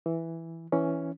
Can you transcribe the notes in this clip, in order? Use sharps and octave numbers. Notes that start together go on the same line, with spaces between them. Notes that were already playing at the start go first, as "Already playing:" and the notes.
E3
E3 C#4